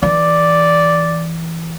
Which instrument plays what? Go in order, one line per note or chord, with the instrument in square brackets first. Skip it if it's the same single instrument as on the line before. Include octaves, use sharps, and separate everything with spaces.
[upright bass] E3 [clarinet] D5